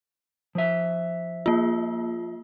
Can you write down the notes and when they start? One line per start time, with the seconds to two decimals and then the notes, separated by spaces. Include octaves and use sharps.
0.55 F3 E5
1.46 A#3 F4